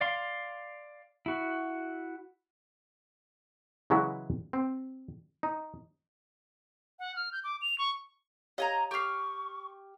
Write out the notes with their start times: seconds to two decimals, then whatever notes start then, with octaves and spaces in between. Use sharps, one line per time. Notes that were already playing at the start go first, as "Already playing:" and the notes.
0.01 D5 F5 C6
1.26 E4 F#4
3.90 C#3 E3 F#3 G#3 E4 F#4
4.53 C4
5.43 D#4
6.99 F#5
7.16 F6
7.32 G6
7.44 D6
7.62 F7
7.78 C#6
8.58 G4 C#5 D#5 F5 G#5 A#5
8.91 G4 C#6 D6 F6 C7